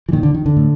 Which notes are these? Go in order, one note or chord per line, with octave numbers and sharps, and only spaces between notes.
E3
A#2 D#3
D3
D#3
D3
A2